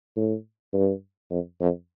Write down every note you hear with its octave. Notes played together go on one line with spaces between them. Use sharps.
A2
G2
F2
F2